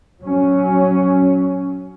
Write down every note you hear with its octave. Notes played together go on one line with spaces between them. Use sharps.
F#3 C#4